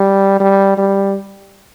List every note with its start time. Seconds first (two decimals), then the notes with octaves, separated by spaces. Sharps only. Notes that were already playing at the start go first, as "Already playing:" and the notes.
Already playing: G3
0.40 G3
0.78 G3